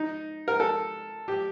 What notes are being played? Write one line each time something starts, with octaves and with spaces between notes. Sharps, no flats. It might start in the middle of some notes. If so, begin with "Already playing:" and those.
Already playing: D#4
A#4
A4
G4